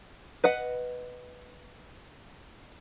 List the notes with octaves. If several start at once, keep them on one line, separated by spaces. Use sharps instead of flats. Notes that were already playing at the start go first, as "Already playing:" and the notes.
B4 D#5 F#5